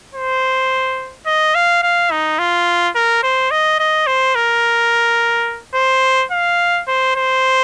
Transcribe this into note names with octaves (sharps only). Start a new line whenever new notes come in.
C5
D#5
F5
F5
D#4
F4
A#4
C5
D#5
D#5
C5
A#4
C5
F5
C5
C5